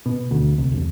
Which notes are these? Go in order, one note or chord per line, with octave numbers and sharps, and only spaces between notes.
B2
D2
C2
E1